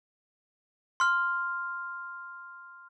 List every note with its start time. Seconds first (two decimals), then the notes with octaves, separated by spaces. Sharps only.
1.00 C6 F6